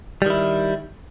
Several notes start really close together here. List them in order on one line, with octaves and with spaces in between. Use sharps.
G3 D#3 E4